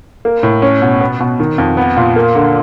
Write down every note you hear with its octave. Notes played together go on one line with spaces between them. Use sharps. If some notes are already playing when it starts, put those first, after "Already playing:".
A#3
A2
C#4
B2
B3
B2
D#3
F2
B3
A#2
A#3
D3